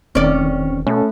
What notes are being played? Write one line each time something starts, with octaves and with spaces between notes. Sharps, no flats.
E1 D#3 C4 C#4 D5
B2 A3 C#4 A4